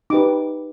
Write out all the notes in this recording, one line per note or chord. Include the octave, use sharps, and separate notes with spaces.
D#4 G4 B4 D6